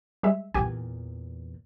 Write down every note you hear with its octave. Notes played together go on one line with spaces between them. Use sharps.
G3 G#3 E5
E2 A#2 G4 G#5